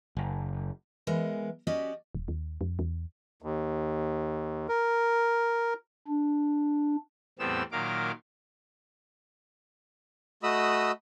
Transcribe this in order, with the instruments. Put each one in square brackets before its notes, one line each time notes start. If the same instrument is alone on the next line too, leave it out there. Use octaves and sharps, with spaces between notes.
[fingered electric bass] F#1
[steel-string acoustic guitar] E3 G#3 B3 A#4 D#5
C#4 F#4 G4 D5 D#5
[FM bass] D#1
D#2
F2
E2
[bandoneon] D#2
A#4
[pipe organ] D4
E2 A2 G3 B3 C4 E6
A#2 D#3 F#3 A#4 F5 D6
[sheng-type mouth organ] A3 F#4 D#5 B5 D#6 E6